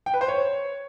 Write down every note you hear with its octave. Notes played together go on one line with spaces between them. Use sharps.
G5
B4
C5
C#5